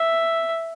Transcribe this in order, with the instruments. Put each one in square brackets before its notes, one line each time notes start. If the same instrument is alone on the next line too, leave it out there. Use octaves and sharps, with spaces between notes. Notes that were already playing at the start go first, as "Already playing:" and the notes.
Already playing: [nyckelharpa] E5